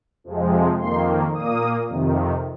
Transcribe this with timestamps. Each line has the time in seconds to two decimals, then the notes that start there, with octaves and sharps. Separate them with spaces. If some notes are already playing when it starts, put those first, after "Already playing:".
0.24 F2 C3 F3 G#3
0.79 F2 D#3 A#3 C6
1.33 A#2 A#3 D#6
1.88 F2 C3 D#3